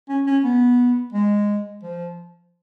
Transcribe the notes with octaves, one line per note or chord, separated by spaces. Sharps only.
C#4
C#4
B3
G#3
F3